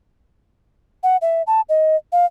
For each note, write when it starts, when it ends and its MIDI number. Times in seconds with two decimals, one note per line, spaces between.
1.03 1.17 78
1.22 1.42 76
1.47 1.61 81
1.69 1.96 75
2.12 2.26 77